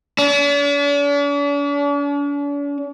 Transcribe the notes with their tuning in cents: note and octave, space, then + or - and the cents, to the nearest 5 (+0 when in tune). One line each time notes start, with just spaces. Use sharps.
D4 -45